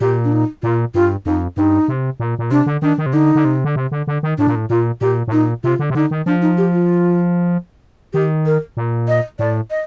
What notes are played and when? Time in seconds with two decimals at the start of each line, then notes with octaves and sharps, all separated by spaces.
0.01 A#2 G4
0.24 D4
0.32 D#4
0.63 A#2 F4
0.95 G2 F4
1.26 F2 D#4
1.57 G2 D#4
1.88 C3
2.20 A#2
2.39 A#2
2.51 C3 D4
2.66 D3
2.82 D#3 D4
2.98 D#3
3.06 C3
3.13 D3 D#4
3.35 D3
3.45 C3
3.65 D3
3.76 C3
3.92 D3
4.07 D3
4.23 D#3
4.38 A2 D4
4.47 A#2
4.55 A2
4.70 A#2 F4
5.01 A#2 G4
5.28 A2
5.32 A#2 D#4
5.64 C3 F4
5.79 D3
5.90 C3
5.95 D3 D#4
6.11 D#3
6.26 F3 D4
6.42 D#4
6.58 G4
6.73 F4
8.13 D#3 G4
8.46 A#4
8.77 A#2
9.08 D#5
9.39 A2 D5
9.70 D#5